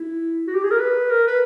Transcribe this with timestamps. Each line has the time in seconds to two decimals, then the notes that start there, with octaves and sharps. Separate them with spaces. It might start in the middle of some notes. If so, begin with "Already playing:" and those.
Already playing: E4
0.47 F#4
0.54 G4
0.63 G#4
0.71 A#4
0.78 B4
1.10 A#4
1.27 B4